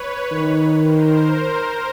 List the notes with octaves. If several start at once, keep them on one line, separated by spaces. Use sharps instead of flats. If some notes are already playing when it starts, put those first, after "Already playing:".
Already playing: B4 C#5
D#3
A#4 C5